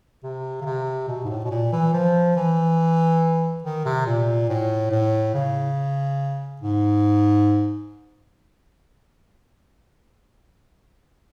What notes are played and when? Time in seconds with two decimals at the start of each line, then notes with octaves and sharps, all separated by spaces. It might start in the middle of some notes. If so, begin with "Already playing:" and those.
0.23 C3
0.61 C#3
0.65 C3
1.08 B2
1.24 G#2
1.30 A2
1.44 B2
1.51 A#2
1.73 E3
1.93 F3
2.36 E3
3.64 D#3
3.85 C3
4.06 A#2
4.49 A2
4.91 A2
5.34 C#3
6.61 G#2